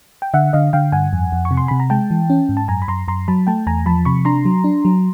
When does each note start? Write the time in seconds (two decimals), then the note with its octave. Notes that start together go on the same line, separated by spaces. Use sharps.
0.22 G5
0.34 D3 E5 F#5
0.53 D3 D#5 F5
0.73 D3 F5 G5
0.92 G2 F#5 G#5
1.13 F2
1.32 F2
1.45 C#6
1.51 C3
1.57 C6
1.68 C3 B5
1.80 A#5
1.90 G#3 G5 A5
2.11 E3
2.30 C#4
2.49 G#2
2.57 A5
2.68 F#2 G#5 A#5
2.82 B5
2.88 F#2 A#5 C6
3.08 F#2 A#5 C6
3.28 F#3 A5 B5
3.47 A3 G5 A5
3.67 E2 G#5 A#5
3.86 F3 A5 B5
4.05 C3 B5 C#6
4.25 D4 A#5 C6
4.45 F#3
4.64 D4
4.85 F#3